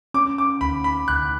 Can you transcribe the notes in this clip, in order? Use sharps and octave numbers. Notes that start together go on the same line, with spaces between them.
C#4 D6
D6
D2 B5
B5
D2 F#6